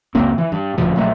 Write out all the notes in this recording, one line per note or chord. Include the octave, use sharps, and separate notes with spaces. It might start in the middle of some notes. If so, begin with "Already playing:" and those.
C#2 F#2 A#3 C4
E3
G2
D#1 D2 B2 F3
A#1 F#3 A3